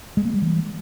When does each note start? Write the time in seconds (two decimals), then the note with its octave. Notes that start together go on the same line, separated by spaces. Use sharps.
0.17 G#3
0.25 A#3
0.33 G3
0.42 E3